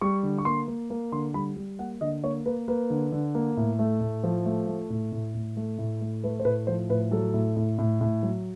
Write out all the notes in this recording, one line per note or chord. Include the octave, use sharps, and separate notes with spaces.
G3 C#6
D3
C#6
A#3 C6
A#3
A#3
D3 C6
G3 B5
G3
A#3 F#5
D3 D#5
A#3 C#5
A#3 B4
A#3 B4
D3
D3
A#3
A2
A3
A2
F3
A3
A3
A2
A2
A2
A3
A2
A3
A3 B4
C5
A2 B4
F3 C5
A2 B4
F#3 A4
A2
A2
A2
A2
F#3